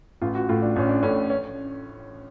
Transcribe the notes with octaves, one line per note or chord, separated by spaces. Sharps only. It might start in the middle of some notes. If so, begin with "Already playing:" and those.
A1 F4
F#4
A2 F4
D4
A1 C#4
D4
A2 C#4
C#4